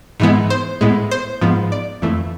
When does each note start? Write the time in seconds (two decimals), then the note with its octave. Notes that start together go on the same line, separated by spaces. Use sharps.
0.20 G#2 E3 G#3 B3
0.50 C5
0.81 A2 G#3 B3
1.11 C5
1.41 G#2 F3 B3
1.72 D5
2.02 F2 E3 A3